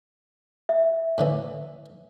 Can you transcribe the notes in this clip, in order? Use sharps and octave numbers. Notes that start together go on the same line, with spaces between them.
E5
A2 D3 E3